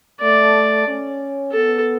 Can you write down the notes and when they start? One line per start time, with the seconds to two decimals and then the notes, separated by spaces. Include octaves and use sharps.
0.21 A3 D5
0.86 C#4
1.52 B3 A4